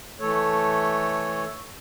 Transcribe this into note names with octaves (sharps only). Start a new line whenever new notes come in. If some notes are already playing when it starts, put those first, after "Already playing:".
E3 A3 A4 C#5